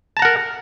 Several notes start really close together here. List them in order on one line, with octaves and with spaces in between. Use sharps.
A5 A#5 F#5 A#4